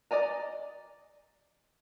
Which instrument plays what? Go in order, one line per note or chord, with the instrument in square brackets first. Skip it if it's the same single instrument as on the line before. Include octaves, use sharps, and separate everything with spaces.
[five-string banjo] D5 D#5 G#5 A#5